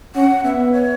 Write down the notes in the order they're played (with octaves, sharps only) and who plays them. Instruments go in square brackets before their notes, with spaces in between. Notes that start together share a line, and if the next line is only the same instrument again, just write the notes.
[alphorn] C#4 [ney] F#5
[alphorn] B3 [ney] E5
[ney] C#5